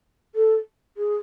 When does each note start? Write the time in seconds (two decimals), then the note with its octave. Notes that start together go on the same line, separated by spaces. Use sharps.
0.35 A4
0.97 G#4